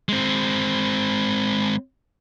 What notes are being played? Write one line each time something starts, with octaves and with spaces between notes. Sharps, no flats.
G#3 C4